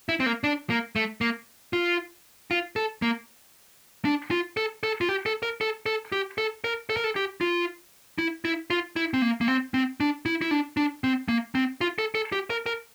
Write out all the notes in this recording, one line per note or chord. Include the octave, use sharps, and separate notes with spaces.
E4
C4
A#3
D4
A#3
A3
A#3
F4
F4
A4
A#3
D4
F4
A4
A4
F4
G4
A4
A#4
A4
A4
G4
A4
A#4
A4
A#4
A4
G4
F4
E4
E4
F4
E4
C4
A#3
A#3
C4
C4
D4
E4
E4
D4
D4
C4
A#3
C4
F4
A4
A4
G4
A#4
A#4